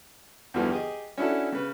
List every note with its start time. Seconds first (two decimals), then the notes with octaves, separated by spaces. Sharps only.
0.54 E2 G2 B2 D3 E3 F3
0.70 G4 G#4 D#5
1.18 C#4 D4 E4 F#4 A4
1.52 C#3 B4